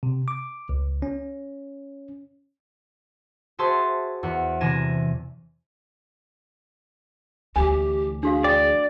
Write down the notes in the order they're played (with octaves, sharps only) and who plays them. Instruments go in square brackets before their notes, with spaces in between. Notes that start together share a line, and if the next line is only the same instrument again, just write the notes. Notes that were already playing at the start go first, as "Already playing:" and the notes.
[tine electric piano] C3
D6
C#2
C#4
[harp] F#4 G#4 C5 E5 A5 C6
E2 F#5
C3 E3 G#5 A#6 E7
[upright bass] D2 E3 [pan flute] G4 [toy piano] G#5
[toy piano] D4 F#4 F5 [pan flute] G#4
[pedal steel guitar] D5 [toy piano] G5